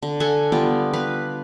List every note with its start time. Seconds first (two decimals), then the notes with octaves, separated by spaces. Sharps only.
0.03 D3
0.20 A4 F#5 G#5
0.52 G3 B3 F4 D5
0.93 B4 F5